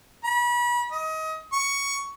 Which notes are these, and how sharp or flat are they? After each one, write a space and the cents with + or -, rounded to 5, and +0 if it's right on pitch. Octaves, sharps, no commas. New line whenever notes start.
B5 -35
D#5 +30
C#6 +10